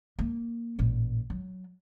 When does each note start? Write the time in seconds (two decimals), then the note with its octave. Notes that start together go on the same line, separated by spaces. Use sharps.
0.19 A#3
0.79 A1 A#2
1.30 F#3